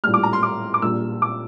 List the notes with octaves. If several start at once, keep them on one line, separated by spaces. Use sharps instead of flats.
A#1 A2 G3 F6
D6
A#5
C6
D6
D6
A#1 A#2 G3 E6
D6